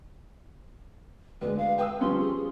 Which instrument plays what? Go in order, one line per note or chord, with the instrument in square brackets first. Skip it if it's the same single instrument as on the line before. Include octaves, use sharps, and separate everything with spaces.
[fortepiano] D2 G#3 [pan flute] B4
[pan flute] F5
[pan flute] B4 [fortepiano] G5 D#6 E6
[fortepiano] F3 G3 C#4 [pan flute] C6
[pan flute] G#4